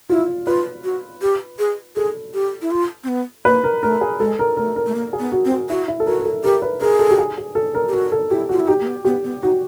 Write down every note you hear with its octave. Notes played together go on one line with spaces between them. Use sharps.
E4 F4
F4 B4
F#4
G4
G#4
G#4 A4
G4
E4
F4
C4
B3
A#3 B4
A#4
A3 A#4
G#4
G#3 A4
A#4
A3 A#4
A#4
A3
A#3
G#4
B3
F#4
C4
F#4
E4 F#4
E4
A4
F#4 A#4
A#4
A4
G4 A#4
B4
G#4 A#4
A4
G4
G#4
G#4
A4
A#4
G4
F#4 A#4
A4
E4 G4
F4 F#4
E4
D#4 G4
A#3
B3
B3 G4
B3
D#4 F#4